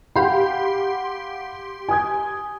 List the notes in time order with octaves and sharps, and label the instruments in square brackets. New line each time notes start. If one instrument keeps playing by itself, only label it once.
[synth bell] G4 C6 [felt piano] F5 F#5 B5
[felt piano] G#5 D#6 G#6